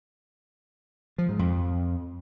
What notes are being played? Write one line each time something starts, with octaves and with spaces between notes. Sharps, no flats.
F3
G#2
F2